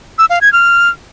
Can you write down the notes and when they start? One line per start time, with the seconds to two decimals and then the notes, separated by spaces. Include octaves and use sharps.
0.18 E6
0.30 F5
0.41 G#6
0.53 F6